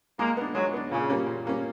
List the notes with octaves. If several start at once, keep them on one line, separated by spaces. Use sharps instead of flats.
G#3 A#3
B3 D4
F#3 G#3
B3 D4
A#2 C#3
G3 A#3 C#4
A#2
G3 A#3 C#4